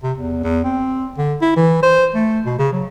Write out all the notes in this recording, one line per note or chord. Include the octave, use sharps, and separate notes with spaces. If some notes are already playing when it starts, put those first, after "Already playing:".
C3
E2
E2
C4
D3
E4
E3
C5
A3
B2
C#3
F#3